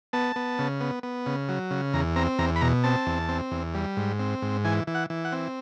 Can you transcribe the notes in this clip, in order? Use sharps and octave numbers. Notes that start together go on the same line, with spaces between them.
B3 A5
B3
C#3
B3
B3
C#3
F#3
C#3
E2 A#5
C4 A#5
E2 A#5
B5
B2 A#5
C4 A5
E2
C4
E2
G3
G#2
C4
G#2
E3 G#5
E3
F#5
E3
F#5
C4